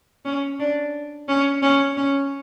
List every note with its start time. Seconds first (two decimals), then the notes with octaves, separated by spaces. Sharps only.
0.25 C#4
0.59 D4
1.28 C#4
1.62 C#4
1.97 C#4